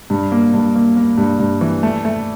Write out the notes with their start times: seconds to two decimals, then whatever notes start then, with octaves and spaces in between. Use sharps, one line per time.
0.10 G2
0.32 A#3
0.54 G2
0.75 A#3
0.96 A#3
1.18 G2
1.39 G2
1.61 E3
1.83 A3
2.05 A3